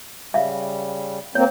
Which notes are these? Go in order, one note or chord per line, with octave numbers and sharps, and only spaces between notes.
C#3 G3 E5 F5
D3 A#3 C4 C#5